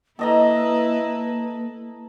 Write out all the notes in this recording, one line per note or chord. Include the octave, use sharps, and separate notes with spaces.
A#3 E4 A4 B4 D#5 A#5